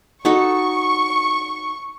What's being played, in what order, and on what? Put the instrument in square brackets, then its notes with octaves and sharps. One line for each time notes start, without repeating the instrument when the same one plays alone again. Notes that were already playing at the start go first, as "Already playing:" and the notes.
[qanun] D#4 F#4 A4 [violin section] C#6